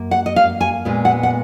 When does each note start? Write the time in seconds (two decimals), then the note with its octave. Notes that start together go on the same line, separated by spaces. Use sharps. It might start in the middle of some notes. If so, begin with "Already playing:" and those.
Already playing: F#2 A#3
0.11 F#5
0.26 D#5
0.36 F5
0.61 G#5
0.85 A#2 G#3 B3
1.05 F#5
1.23 F#5